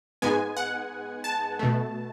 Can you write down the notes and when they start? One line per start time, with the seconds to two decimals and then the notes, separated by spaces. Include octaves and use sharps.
0.22 G#2 G#3 B3 G#5
0.57 F#5
1.24 A5
1.59 B2 A3